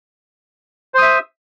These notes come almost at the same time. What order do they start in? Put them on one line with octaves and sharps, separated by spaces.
C5 D#6 E5